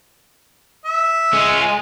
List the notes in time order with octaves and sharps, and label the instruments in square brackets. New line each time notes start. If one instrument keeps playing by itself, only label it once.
[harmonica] E5
[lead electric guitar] G#3 [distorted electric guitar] C#4 F4